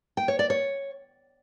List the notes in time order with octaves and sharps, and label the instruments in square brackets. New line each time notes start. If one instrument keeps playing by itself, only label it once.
[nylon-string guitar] G5
C#5
D5
C#5